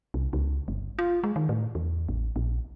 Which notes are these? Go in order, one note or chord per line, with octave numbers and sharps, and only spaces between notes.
C2
C#2
G1
F4
G#3
D#3
A2
E2
A1
A#1